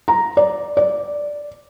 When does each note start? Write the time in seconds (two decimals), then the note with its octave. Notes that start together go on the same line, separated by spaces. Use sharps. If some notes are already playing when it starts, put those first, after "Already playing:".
0.08 A#5
0.37 D5
0.77 D5